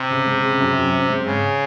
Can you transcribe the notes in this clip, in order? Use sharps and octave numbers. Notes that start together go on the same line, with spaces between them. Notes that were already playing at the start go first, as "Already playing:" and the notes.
Already playing: C3
C#3
G#3
C#3
F#2
F#2
C4
G#3
G#2 C#3